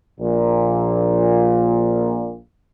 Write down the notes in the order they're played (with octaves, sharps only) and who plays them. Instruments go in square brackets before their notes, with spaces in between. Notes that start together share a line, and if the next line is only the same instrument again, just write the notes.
[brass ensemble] A#1 A#2